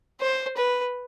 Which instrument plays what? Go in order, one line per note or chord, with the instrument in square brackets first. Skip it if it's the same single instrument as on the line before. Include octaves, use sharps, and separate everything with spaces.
[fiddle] C5
B4